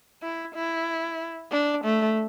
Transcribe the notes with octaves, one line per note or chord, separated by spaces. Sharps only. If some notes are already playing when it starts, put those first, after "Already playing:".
E4
E4
D4
A3